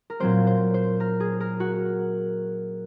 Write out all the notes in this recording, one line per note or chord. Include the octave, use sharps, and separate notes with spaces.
A#4
A#2 F#3 C4 C5
C5
C5
A#4
G#4
A#4
F#4